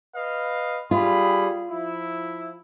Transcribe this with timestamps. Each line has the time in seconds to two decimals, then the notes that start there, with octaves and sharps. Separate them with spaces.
0.15 B4 D#5 F5
0.91 G3 F4 G#4 B5
1.70 F3 E4